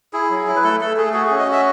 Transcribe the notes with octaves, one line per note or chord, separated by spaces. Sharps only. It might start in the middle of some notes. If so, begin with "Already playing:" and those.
E4 G#4
F#3
E4
B4
A3 A4
A3 A4
A3 G#4
F#4 G#4
G#4
C#4
D#5
F#4 E5